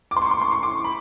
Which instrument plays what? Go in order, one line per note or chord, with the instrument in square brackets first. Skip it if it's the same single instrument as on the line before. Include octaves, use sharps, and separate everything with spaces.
[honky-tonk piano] D6
C6
C#6
C6
C6
C#6
D6
B5